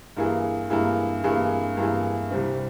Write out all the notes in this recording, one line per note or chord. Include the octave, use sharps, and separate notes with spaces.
G2 E3 A#3 E4 G#4
G2 E3 A#3 E4 G#4
G2 E3 A#3 E4 G#4
G2 E3 A#3 E4 G#4
C2 C3 G3 C4